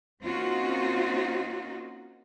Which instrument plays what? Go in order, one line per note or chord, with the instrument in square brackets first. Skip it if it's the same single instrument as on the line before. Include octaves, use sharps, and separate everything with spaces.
[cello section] A#3 C4 C#4 D#4 F4 F#4